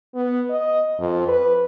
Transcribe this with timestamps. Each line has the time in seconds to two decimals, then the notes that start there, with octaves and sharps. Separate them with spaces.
0.15 B3
0.50 D#5
0.99 F2
1.28 B4